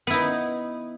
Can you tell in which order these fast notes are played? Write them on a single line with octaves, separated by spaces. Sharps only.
B3 E4 D#4